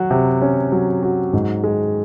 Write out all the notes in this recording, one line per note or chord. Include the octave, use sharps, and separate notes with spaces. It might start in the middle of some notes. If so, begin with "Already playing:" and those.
Already playing: F#3 F#4
C3
C#4
F#3
F#4
G#2
G#3